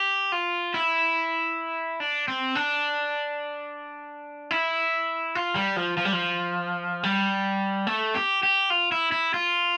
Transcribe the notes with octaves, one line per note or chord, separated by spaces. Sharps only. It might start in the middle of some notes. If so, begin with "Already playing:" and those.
Already playing: G4
F4
E4
D4
C4
D4
E4
F4
G3
F3
F3
G3
F3
G3
A3
G4
G4
F4
E4
E4
F4